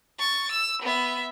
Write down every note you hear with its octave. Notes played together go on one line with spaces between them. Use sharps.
C#6 A6
E6
B3 E5